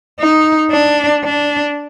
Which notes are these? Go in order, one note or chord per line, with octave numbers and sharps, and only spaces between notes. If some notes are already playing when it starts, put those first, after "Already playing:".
D#4
D4
D4